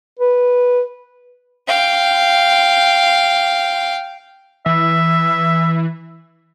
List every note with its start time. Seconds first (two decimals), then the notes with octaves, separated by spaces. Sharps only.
0.19 B4
1.68 F5 G5
4.66 E3 E5